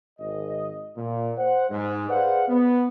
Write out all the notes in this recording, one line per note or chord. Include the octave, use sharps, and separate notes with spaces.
G#1 D#5
A#2
C5 F#5
G#2
G#4 B4 C5 D5 F5 F#5
B3